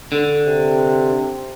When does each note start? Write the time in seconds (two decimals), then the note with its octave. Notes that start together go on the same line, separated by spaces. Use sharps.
0.12 D3
0.45 C3